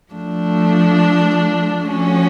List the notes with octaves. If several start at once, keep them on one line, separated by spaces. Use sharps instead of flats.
F3 A3 D4
F3 A3 C#4 F#4